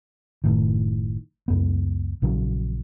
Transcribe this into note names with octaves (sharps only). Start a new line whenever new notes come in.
F#1 A2 D#3
C#2 F#2 B3
A#1 C#3 F#3